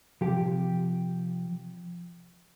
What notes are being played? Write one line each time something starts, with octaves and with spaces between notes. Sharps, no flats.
C3 F3 G4